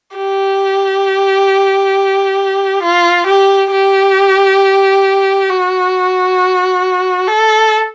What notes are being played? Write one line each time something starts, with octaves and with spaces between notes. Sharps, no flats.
G4
F4
G4
G4
F#4
A4